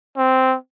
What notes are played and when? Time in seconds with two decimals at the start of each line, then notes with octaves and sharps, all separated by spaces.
0.17 C4